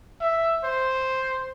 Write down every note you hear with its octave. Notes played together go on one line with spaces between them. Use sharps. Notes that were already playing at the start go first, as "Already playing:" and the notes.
E5
C5